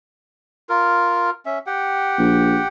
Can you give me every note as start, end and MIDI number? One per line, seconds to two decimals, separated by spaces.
0.69 1.30 65
0.69 1.30 70
1.46 1.59 61
1.46 1.59 76
1.66 2.68 67
1.66 2.68 78
1.66 2.68 79
2.18 2.60 34